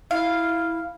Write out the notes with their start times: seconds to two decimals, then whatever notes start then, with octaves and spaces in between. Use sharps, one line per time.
0.11 E4 F5